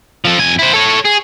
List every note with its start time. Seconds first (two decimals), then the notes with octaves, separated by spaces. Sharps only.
0.25 F3 A4
0.39 F2 G#5
0.59 E4 C5
0.73 A4 C#5
1.05 G#4